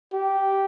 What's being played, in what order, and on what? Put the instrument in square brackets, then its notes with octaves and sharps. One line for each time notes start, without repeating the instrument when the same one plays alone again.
[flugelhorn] G4